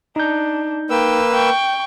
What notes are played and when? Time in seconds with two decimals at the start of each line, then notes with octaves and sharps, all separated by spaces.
0.16 D4 D#4 G6
0.90 A#3 B4 G5 E6
1.32 G5 C#6